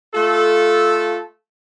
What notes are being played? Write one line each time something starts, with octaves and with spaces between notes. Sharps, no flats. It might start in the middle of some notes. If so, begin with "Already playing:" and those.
A3 F4 A4